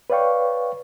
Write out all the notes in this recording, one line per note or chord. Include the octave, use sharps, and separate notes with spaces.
B4 C#5 D5 F5 G5 C#6